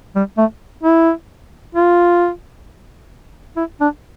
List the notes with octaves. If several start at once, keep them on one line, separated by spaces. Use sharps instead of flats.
G3
A3
E4
F4
E4
D4